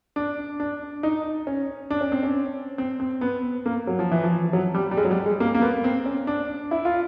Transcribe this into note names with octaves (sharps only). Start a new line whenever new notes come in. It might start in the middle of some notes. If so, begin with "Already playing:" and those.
D4
D4
D#4
C#4
D4
C#4
C4
C#4
C4
C4
B3
A#3
F#3
F3
E3
F3
F#3
G3
G3
G#3
F#3
G3
G#3
A#3
A#3
B3
C4
C#4
D4
E4
F4